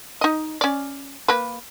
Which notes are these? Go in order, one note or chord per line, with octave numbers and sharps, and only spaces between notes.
D#4 D#5
C#4 D5
A#3 B4